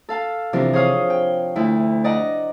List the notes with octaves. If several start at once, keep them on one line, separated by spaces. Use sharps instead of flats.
A4 F5 A5
C3 E3 F3 D4 G4 A#4
G#4 C5 C#5 F5 D#6
G5
D2 E4
D5 D#5 F#5 A#5